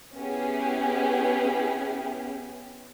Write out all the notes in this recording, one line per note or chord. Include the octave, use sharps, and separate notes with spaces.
B3 C#4 E4 G4 G#4